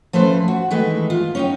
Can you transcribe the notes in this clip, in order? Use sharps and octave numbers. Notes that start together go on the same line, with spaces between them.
F3 A3 C#4 B4 C5
F#4
D#3 E3 G#3 A3 B4
F4
C#4 D#4 G5